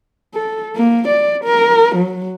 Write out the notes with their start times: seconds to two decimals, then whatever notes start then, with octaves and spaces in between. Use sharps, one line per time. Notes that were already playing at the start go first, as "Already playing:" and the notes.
0.34 A4
0.76 A#3
1.08 D5
1.44 A#4
1.95 F#3